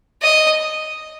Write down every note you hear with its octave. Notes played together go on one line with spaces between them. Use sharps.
D#5